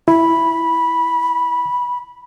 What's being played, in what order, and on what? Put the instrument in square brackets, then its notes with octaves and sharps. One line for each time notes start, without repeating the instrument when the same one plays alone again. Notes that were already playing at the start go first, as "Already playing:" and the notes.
[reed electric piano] E4 [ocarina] B5